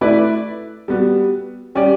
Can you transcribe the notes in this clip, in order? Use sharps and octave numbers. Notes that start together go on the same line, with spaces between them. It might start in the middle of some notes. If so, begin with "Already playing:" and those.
A3 E4 B4 D5
G3 B3 F#4
G3 C#4 G4 D5